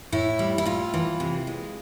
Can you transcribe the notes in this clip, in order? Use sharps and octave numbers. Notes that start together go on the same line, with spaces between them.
A2 E4
G3
E4
A2 F4
E3
C3
G#3